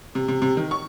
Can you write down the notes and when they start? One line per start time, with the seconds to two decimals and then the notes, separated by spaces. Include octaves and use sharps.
0.15 C3
0.28 C3
0.42 C3
0.57 D#3
0.71 C#6